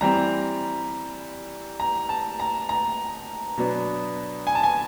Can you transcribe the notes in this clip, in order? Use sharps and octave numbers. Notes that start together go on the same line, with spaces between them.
E3 G3 C4 A#5
A#5
A5
A#5
A#5
B2 F#3 B3 D4
G#5
A5
G#5